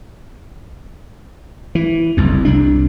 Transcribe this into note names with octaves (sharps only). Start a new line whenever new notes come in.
E3
F#1 C2 F2
C2 C3 D4